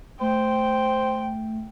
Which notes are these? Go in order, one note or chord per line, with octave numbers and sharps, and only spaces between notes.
A3 C5 G5